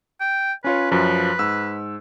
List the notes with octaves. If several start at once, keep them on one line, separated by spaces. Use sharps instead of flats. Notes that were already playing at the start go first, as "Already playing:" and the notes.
G5
C#4 F4 B4 C#5
F#2 F3 B4
G#2 E6